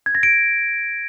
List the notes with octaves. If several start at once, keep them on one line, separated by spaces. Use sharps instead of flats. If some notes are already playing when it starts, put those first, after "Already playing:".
G#6
A#6
D7